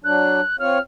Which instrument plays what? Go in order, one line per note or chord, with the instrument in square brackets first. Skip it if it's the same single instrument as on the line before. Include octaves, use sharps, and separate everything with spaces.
[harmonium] F#3 D4 [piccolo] F#6
[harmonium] C4 F4 C#5 [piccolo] F6